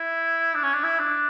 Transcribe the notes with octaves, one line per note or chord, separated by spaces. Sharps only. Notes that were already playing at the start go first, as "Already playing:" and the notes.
Already playing: E4
D4
C#4
D4
E4
D4